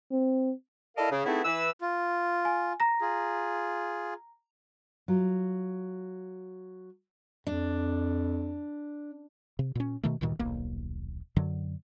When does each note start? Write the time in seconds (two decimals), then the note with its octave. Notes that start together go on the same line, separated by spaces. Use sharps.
0.11 C4
0.96 E4 A4 A#4 D5 D#5 F5
1.11 C#3
1.26 A3 B3 C4 D#4 E4 G#4
1.45 E3 B4 E6
1.81 F4
2.45 G#5
2.80 A#5 A#6
3.01 F4 G#4
5.08 F#3 F4
7.47 F2 D4
9.59 C3
9.75 A#2 C#4
10.03 B2 D#3 A3
10.21 D2 G2 A#2 D#3
10.39 D#1 B1 A#3
11.36 F#2 D3 F#3